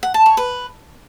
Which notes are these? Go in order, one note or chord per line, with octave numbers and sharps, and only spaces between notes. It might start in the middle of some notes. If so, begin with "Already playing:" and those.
F#5
A5
C#5
B4